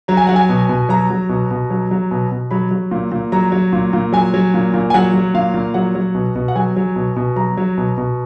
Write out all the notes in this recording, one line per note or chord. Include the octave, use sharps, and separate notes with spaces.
F#3 A#5
G#5
F#3 F#5
G#5
B2
B2
F#3 A#5
F#3
B2
B2
F#3
F#3
B2
B2
F#3 B5
F#3
A#2
A#2
F#3 A#5
F#3
A#2
A#2
F#3 G#5
F#3
A#2
A#2
G#5
F#3 F#5
F#3
A#2 F5
A#2
F#3 F#5
F#3
B2
B2
F#5
F#3 G#5
F#3
B2
B2
F#3 A#5
F#3
B2
B2